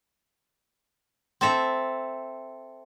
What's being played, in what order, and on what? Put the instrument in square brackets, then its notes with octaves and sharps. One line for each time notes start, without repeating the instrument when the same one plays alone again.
[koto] C4 A4 E5